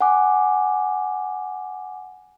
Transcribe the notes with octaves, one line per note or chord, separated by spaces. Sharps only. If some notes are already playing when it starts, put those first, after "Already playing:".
F#5 G#5 D6